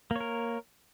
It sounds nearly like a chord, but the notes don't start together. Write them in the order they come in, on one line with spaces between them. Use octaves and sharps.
A#3 C#5 A#4